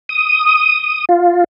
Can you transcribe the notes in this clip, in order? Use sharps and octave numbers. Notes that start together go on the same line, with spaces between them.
D#6
F4